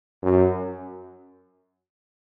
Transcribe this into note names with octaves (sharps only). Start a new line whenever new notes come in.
F#2